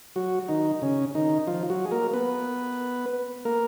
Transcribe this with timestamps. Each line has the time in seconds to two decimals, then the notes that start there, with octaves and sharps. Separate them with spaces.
0.16 F#3 F#4
0.49 D#3 D#4
0.82 C#3 C#4
1.15 D#3 D#4
1.47 F3 F4
1.70 F#3 F#4
1.85 G#4
1.91 A#3 A#4
2.13 B3 B4
3.45 A#3 A#4